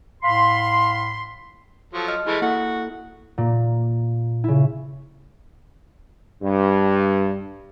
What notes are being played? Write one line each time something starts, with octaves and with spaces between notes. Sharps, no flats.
A2 F5 B5 C6
F3 F#3 A4
D#5 F6
E3 G#3 A3 E4
A#3 E4 F#4 A4 F#5
A#2 A#3
C#3 E4
G2